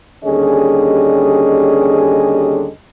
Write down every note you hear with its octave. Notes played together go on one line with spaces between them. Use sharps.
D#2 D3 G3 C#4 G#4 D#5